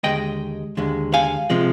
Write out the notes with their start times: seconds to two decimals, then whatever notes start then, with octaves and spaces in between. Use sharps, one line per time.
0.03 D#2 D3 G#3 D#5 G5
0.77 D#2 D3 G#3
1.14 F5 G#5
1.50 C3 F3 G#3